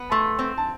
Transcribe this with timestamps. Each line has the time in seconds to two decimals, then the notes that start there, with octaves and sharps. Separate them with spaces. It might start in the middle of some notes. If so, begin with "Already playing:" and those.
Already playing: B3
0.11 A3 C6
0.39 C4
0.58 A5